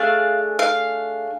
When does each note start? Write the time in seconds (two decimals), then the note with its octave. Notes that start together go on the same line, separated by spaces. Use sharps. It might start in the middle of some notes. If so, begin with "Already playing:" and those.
Already playing: A3 D4 G#4 F5
0.59 F5